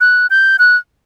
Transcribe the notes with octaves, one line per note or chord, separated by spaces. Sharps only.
F#6
G6
F#6